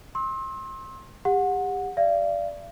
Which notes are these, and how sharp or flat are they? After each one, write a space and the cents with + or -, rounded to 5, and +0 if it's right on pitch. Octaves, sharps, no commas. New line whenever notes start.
C6 +30 E6 -30
G4 +30 F#5 -15
D5 +0 F5 -40